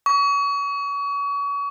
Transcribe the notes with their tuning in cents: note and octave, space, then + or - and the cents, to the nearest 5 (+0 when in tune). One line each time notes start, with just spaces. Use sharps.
C#6 +35